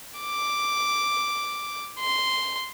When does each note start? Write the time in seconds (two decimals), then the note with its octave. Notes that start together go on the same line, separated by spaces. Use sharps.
0.20 D6
2.00 C6